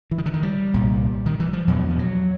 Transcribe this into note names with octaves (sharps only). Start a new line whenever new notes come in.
E3
D#3
D3
D#3
G3
C2 A#2
D#3
E3
F3
E2 B2 F#3
F3
F#3